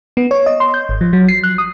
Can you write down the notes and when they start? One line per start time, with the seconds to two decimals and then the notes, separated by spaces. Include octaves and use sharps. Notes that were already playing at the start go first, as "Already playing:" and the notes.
0.17 B3
0.31 C#5
0.46 D#5
0.60 C6
0.74 G6
0.89 G#1
1.01 F3
1.13 F#3
1.28 C7
1.43 F#6
1.58 D#6